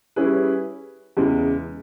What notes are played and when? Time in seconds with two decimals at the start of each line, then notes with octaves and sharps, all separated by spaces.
0.16 G3 C#4 E4 G#4 B4
1.17 E2 C#3 G#3